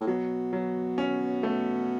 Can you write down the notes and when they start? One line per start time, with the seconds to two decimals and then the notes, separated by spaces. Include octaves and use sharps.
0.01 A2
0.07 B2 F#3
0.53 F#3
0.98 C#4
1.43 A3